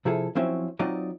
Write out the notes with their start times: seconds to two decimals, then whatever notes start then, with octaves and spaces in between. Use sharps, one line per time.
0.05 C3 F3 E4 G#4 A4
0.35 F3 F#3 C4 C#4 E4
0.79 F#3 C4 D#4 F4 D5 D#5